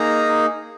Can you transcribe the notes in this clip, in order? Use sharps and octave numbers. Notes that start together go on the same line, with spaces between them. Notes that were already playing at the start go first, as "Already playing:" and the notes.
Already playing: A#3 D#4 G#4 A#5